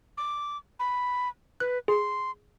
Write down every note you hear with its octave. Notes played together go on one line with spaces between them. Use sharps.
D6
B5
B4 F#6
G#4 C6